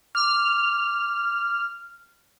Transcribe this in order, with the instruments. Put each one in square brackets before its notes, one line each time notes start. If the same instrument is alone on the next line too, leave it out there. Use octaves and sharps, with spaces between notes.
[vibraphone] D6 [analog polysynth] F6